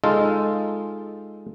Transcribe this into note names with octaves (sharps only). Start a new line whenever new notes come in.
G#3 D#4 F4 A4